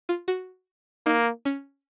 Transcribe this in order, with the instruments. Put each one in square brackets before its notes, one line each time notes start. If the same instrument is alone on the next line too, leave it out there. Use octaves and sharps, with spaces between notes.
[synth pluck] F4
F#4
[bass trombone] A#3 [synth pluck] D#4
[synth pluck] C#4